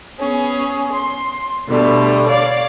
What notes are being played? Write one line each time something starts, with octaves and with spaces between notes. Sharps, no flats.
B3 C#4 G#4
C6
B2 D3 G3 A3
C#5 D5 F5